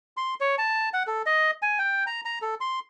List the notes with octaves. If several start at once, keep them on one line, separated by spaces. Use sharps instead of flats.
C6
C#5
A5
F#5
A4
D#5
G#5
G5
A#5
A#5
A4
C6